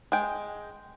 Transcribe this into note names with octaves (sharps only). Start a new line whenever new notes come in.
G#3 G5